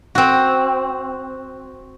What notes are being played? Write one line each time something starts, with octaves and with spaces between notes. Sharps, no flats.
C4 F#4